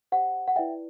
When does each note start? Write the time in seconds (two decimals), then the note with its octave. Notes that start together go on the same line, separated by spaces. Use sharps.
0.12 G4 C5 F#5
0.48 F#5
0.56 E4 B4 D5 E5 G5